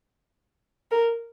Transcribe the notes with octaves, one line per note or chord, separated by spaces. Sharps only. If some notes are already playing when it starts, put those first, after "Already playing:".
A#4